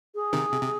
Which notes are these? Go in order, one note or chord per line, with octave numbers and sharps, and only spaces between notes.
G#4
C3 D#3
C3
C3